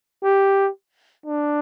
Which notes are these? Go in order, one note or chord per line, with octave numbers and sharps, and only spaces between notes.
G4
D4